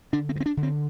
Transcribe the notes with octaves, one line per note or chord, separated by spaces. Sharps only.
D3 D4
C4
G2
C4
D4
D3
C4